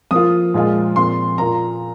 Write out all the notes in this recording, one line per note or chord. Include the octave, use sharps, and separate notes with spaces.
F3 A#3 F4 D#6
A#2 F3 G#3 F4
A#2 F3 C4 C6
A#2 A#3 F4 A#5